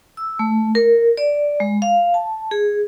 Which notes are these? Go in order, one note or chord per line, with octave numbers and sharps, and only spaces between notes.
E6
A3
A#4
D5
G#3
F5
A5
G#4